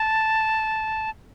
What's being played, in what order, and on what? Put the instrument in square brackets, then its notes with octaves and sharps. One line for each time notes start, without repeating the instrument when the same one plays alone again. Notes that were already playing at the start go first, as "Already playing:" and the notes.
Already playing: [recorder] A5